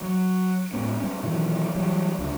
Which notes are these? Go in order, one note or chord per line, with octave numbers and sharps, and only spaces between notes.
F#3
A2 G#3 B3 C#4
G3 C#4
B2 D#3 E3 F#3
E3 F#3 G3
C#2 D3